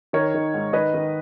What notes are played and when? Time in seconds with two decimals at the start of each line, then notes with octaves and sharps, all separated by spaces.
0.13 D#3 A#4 C#5
0.34 D#3
0.54 G#2
0.73 D#3 B4 D#5
0.94 D#3